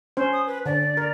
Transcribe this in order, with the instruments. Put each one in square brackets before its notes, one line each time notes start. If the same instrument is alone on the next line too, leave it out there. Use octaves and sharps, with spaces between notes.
[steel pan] C#4 C5
[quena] D#6
B4
[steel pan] D3 [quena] D5
[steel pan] A#4